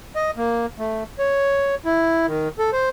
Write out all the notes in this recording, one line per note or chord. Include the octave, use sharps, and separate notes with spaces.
D#5
A#3
A3
C#5
E4
D#3
A4
C5